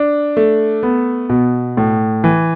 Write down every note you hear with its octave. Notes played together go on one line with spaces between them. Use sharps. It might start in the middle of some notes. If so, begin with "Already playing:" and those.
Already playing: D4
A3
B3
B2
A2
E3